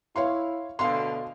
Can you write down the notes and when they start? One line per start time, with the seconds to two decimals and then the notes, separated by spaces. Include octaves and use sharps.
0.16 E4 C#5 F5 C6
0.79 D2 B2 D3 F5 C6